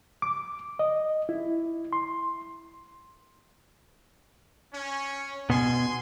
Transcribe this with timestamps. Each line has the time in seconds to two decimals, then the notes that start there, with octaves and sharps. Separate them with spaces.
0.22 D6
0.79 D#5
1.29 E4
1.93 C6
4.73 C#4
5.50 B2 G#5 C6